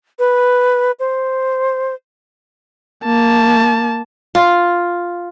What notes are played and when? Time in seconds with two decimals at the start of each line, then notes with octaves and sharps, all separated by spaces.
0.19 B4
0.99 C5
3.05 A#3 A5
4.35 F4